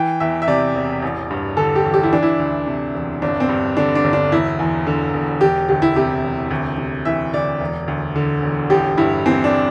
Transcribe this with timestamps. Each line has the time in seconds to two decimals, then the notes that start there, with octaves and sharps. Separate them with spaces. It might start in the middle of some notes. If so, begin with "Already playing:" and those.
Already playing: E3 G5
0.20 E2 E5
0.42 E5
0.48 C3 D5
0.75 E1
1.02 A1
1.30 G2
1.57 D3 A4
1.76 G4
1.85 A1
1.94 G4
2.03 E4
2.12 E3 D4
2.23 E4
2.40 D2
2.67 C3
2.94 E1
3.22 G1 D4
3.40 C4
3.49 G2
3.77 D3 D4
3.95 D4
4.04 G1
4.13 D4
4.31 E1 E4
4.59 E2
4.87 D3
5.14 E1
5.41 E1 G4
5.68 D2 G4
5.82 E4
5.96 C3 G4
6.23 E1
6.51 D2
6.78 C3
7.05 E3 E5
7.34 D2 D5
7.61 E1
7.88 D2
8.16 D3
8.42 E1
8.70 A1 G4
8.98 G2 E4
9.26 E3 C4
9.44 D4